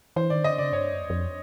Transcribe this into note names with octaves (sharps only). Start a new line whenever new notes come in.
E3 C5
D#3 D5
D3 D#5
C#3 D5
G2 C#5
F#2
E2
F2